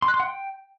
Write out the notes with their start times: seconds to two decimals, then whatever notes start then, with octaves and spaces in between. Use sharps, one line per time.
0.02 C6
0.08 F#6
0.14 C6
0.20 F#5
0.25 G5